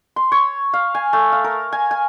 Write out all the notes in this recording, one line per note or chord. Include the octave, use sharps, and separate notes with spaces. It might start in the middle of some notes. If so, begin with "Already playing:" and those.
C6
C#5
F5
G#5
A3
F5
A#4
G#5
G#5